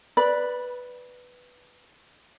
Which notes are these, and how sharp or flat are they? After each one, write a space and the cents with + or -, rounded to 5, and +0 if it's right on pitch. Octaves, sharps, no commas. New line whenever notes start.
B4 +0 D5 +0 B5 -20